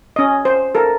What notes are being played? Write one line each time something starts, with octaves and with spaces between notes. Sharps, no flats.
C#4 D#5
C5
A4 A#4